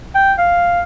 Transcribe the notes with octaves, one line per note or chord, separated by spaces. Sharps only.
G5
F5